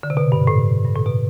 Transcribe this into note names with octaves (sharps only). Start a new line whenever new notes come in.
D3
C3
B2
G2
A2
G2
A2
B2